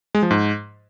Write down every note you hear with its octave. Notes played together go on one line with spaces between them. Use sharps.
G#3
F3
G#2